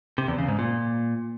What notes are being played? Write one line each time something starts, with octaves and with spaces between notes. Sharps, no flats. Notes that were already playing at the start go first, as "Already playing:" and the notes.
C3
E2
C#3
G#2
A#2